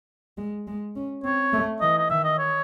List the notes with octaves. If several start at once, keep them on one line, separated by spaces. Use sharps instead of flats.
G#3
G#3
C#4
C4 C#5
A3
E3 D#5
D#5
D#3 E5
D#5
C#5